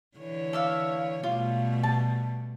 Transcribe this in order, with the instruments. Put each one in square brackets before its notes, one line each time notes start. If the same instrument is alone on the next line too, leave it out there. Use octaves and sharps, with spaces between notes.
[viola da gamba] D3 E3 C#5
[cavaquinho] A4 E5 F5
[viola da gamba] B2 G3 A3 [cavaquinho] F4
[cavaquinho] A5